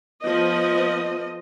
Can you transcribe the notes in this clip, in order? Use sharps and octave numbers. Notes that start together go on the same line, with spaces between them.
F3 A3 B3 D#5